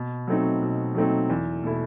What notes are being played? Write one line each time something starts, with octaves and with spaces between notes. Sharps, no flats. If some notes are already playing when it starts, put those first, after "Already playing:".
Already playing: B2
F#3 A3 C4 D#4
B2
F#3 A3 C4 D#4
E2
B2 A3 E4